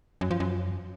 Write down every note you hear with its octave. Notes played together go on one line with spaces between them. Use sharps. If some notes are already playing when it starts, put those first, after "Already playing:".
F#2
F3
F#2